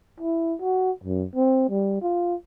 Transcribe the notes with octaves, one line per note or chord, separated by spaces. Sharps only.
E4
F#4
F#2
C4
G3
F4